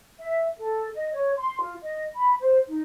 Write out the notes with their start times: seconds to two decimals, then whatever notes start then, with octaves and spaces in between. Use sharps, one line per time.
0.20 E5
0.59 A4
0.95 D#5
1.14 C#5
1.38 C6
1.61 F4
1.82 D#5
2.16 B5
2.41 C5
2.69 D#4